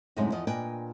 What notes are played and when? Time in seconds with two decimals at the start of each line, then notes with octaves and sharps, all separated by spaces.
0.17 F#2 A2 C3 G#3 C#4 D#4
0.32 E2 F3 D#5
0.47 A#2 D4 B4 D#5 G5 G#5